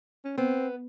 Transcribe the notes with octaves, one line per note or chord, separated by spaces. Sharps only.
C#4
B3 C4